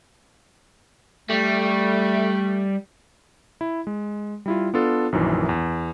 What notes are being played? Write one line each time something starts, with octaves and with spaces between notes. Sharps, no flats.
G3 A3
E4
G#3
G3 E4 F4
B3 D4 F4 A4
A#1 F#2 D#3 E3
E2